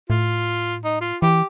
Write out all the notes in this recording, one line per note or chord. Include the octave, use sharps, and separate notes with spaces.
A2 F4
D#4
F4
E3 G4